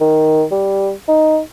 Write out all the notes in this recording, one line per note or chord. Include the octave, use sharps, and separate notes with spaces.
D#3
G3
D#4